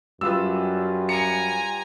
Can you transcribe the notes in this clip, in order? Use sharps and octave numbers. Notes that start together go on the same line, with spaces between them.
F#2 G3 F4 B4 E6
G#5 A#5 C#7